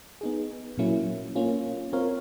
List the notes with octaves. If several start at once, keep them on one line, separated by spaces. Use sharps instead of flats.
B3 D#4 G#4
A#2 F#3 A#3 C#4 E4
A#3 C#4 F4
C4 F4 A#4 C#5 F5